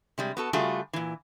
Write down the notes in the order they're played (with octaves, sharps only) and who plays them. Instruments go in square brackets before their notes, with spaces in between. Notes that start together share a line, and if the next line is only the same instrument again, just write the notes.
[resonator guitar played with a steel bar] C3 G3 G#3
B3 F#4 A4
C#3 G3 A3 F4 F#4 G#4
A#2 E3